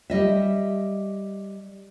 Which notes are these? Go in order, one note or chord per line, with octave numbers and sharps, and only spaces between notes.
G3 D#5 E5